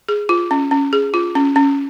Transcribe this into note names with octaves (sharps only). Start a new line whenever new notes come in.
G#4
F4
C#4
C#4
G#4
F4
C#4
C#4